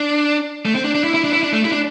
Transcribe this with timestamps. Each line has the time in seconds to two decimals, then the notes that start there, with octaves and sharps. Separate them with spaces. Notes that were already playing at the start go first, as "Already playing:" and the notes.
Already playing: D4
0.65 A3
0.75 C4
0.84 D4
0.95 D4
1.04 E4
1.14 E4
1.24 D4
1.33 E4
1.43 D4
1.53 A3
1.65 E4
1.72 D4